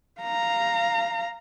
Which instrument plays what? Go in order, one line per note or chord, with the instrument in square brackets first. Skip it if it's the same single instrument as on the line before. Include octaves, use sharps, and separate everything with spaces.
[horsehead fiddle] F5 A#5